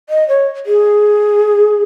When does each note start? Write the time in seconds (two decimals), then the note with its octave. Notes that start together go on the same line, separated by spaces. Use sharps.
0.10 D#5
0.28 C#5
0.66 G#4